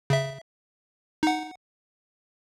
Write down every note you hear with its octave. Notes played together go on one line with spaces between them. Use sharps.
C#3 E5
D#4 F#5